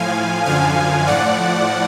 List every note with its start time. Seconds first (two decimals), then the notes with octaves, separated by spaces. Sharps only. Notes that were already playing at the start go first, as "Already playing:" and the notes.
Already playing: A2 F3 F5 G#5
0.45 F#2 D3 F3 F5 G#5
1.07 A2 F3 D5 F#5